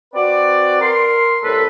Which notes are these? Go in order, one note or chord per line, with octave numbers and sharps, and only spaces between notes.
C4 F#4 B4 D5
A#4 C6
C2 A2 A4 B4